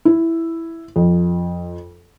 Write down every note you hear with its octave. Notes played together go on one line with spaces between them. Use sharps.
E4
F2